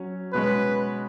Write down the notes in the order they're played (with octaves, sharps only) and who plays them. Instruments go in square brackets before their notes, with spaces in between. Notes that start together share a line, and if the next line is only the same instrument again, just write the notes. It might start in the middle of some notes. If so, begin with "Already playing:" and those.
Already playing: [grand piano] F#3 C#4
[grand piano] B2 G#3 C#4 [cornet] B4